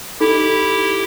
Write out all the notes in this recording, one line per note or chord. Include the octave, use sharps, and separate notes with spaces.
D#4 E4 G4 A4